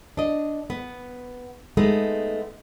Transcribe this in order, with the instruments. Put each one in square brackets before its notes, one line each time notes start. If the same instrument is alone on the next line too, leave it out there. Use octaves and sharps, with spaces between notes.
[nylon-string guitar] D4 D#5
B3
G#3 A3 B3 D#4